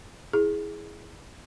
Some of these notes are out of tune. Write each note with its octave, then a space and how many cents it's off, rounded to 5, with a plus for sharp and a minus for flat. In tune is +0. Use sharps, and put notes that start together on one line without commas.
E4 -10 G#4 +0